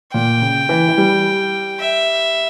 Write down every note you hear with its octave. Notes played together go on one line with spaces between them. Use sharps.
A#2 G5
C#3
E3
E3
G3
E5